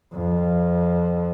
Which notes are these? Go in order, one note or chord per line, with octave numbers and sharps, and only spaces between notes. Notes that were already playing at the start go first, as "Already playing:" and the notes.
F2